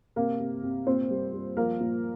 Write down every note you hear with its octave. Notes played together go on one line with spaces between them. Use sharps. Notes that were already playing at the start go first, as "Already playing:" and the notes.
C3 A#3 A#4
C3
C3
A#2 C4 C5
G3
G3
F3 A#3 A#4
A#2